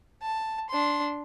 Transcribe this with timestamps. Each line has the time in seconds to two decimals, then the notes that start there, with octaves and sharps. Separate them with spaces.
0.22 A5
0.70 D4 C6